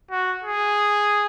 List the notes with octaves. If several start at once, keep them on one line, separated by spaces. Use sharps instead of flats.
F#4
G#4